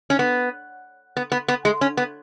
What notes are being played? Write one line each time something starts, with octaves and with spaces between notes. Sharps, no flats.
C#4
B3
B3
B3
B3
G#3
C#4
B3